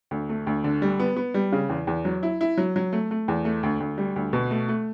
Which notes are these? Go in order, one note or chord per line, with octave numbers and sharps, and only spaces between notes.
D2
A3
D2
D3
G3
B3
B3
G3
C#3
E2
E2
F#3
E4
E4
F#3
F#3
A3
A3
E2
A3
D2
D2
G3
D2
B2
A3
A3